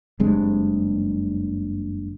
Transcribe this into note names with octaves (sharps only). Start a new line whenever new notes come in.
F#1 G2 G#3 C4